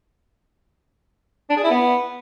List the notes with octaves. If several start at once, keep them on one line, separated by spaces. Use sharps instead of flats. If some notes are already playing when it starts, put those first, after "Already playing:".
D4
G#4
E4
B3